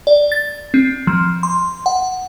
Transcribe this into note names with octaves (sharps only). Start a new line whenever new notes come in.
D5
A6
C4
F3
C6
F#5